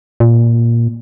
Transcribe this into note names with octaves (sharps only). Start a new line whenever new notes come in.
A#2